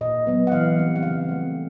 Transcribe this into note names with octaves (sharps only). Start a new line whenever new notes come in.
A#2 D#5
F#3 B3
F#5
E3 F5
G3 C4
F#5
C#3 F5
F3 A3 C4